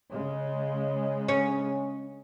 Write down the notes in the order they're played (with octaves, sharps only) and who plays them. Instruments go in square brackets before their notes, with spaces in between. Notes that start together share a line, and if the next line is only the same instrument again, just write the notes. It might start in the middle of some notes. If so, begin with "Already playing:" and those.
[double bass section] C#3 G#3
[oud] C#4